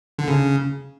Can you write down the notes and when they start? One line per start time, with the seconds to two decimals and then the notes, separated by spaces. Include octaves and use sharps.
0.19 D3
0.28 C#3